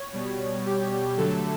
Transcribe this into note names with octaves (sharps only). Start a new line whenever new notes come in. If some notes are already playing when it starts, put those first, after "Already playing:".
Already playing: C#5
B2 G3
G4
D3 F#3 A3 A4